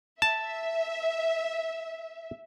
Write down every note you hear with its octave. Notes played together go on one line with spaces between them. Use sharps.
E5 A5